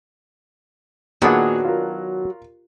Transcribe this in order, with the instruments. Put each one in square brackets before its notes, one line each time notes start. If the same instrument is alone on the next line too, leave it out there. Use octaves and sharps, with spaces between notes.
[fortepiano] A#2 G#4 F#5 [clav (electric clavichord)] D#3 B3 D4 [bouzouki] F#3
[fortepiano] F4 A#4